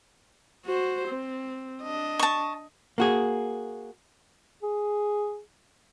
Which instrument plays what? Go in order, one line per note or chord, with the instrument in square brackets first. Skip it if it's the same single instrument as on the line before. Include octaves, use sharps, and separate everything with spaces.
[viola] F#4 C5
C4
D4 D#5
[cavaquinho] A5 C#6
[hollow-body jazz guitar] A#3 F#4 G#4
[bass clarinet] G#4